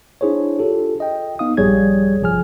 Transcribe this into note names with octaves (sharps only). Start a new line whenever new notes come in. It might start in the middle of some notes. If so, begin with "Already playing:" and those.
D4 E4 G#4 C5 C#5
F4 G4 A4
D#5 G5
B3 D#4 F5 D#6
A#1 G2 G3 G#4 C#5 G#6
G#1 C3 F3 G#4 G#5 F6